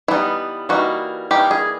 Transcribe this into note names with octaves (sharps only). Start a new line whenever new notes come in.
E3 G3 B3 D#4 E4
E3 G3 A#3 D#4 F#4
E3 G3 A#3 D#4 G4
G#4